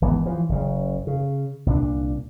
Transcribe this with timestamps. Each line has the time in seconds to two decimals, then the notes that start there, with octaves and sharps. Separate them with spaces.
0.02 G#1 E3 B3
0.26 E3 F3
0.49 F#1 C#3
1.07 C#3
1.66 C2 A#2 C4 D4